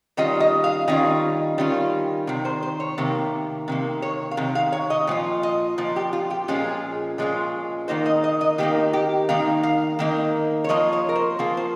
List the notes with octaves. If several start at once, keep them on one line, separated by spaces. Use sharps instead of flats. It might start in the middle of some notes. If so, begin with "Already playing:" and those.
D#3 G3 C#4 F4 D#5
D#5
F5
D#3 G3 C#4 F4 D#5
D#3 G3 C#4 F4
C3 D#3
C5
C5
C#5
C3 D#3 A#3
C3 D#3 A#3
C#5
F5
C3 D#3
F5
C#5
D#5
A#2 F3 F4
D#5
A#2 F3
G4
F4
G4
A#2 F3 G#3 C#4 F4 G#4
A#2 F3 G#3 C#4 F4
D#3 A#3 D#4 C5
D#5
D#5
D#5
D#3 A#3 D#4 G4
G4
D#3 A#3 D#4 F5
F5
D#3 A#3 D#4
C#5
F3 A#3 F4 D#5
C#5
A#4
C5
F3 A#3 F4 G#4
C5